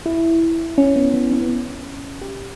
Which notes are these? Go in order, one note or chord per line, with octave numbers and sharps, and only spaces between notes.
E4
C#4
B3
B3
C#4
B3
C#4
G4